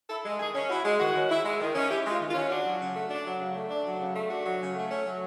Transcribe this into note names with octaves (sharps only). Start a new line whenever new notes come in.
E4 A4
G#3
D#3 G#4
C#4
E4 F#4
G#3
D#3 F#4
C#4
E4
G#3
D#3
C#4
E4 G4
G#3
F4
D#3
F4
C#4
D4 F#4
F#3
C#3
A3
D4
F#3
C#3
A3
D4
F#3
C#3
A3
D4 F#4
F#3
C#3
A3
C#4
F#3